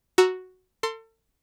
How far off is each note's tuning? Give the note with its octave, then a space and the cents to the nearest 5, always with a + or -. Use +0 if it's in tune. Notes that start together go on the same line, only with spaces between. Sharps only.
F#4 +0 A#5 +0 E6 +0
A4 +35 C6 +0